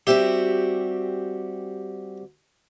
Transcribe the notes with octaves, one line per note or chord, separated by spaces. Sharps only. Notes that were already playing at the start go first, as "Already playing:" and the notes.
G3 C4 F#4 G4 E5